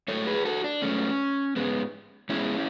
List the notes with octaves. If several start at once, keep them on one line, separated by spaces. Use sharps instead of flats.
G#2 F#3 A3 A4 C#5
G#4 B4
F#4 A4
D4
G#2 F#3 A3 C#4
G#2 G#3 B3
G#2 G#3 B3 C#4 E4